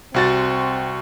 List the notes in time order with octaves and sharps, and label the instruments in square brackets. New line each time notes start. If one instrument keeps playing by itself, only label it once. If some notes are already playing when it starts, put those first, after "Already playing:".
[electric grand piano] C2 F#4 A6 [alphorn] C4